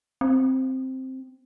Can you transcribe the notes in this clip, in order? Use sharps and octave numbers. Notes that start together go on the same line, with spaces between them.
C4